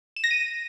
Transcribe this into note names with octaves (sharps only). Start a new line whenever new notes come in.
E7
A#6
D#7